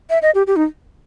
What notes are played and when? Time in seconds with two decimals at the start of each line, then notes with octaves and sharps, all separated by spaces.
0.10 E5
0.22 D#5
0.35 G4
0.47 G4
0.56 D#4